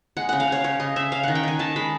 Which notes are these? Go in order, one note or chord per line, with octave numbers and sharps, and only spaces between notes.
G#3 F#5
C#3 F#5
F5
C#3 C#5
C#3 C#5
C#3 D#5
C#3 E5
C#4 F5
D#3 F#5
G5
D#3 G#5
D#3 A5
G#3 B5